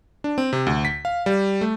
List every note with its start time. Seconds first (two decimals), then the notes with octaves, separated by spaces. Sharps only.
0.24 D4
0.38 C4
0.53 C3
0.67 D2
0.85 B6
1.05 F5
1.26 G3
1.61 A3